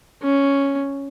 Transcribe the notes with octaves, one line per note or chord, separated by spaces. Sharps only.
C#4